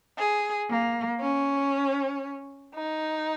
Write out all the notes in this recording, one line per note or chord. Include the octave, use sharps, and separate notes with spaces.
G#4
A#3
C#4
D#4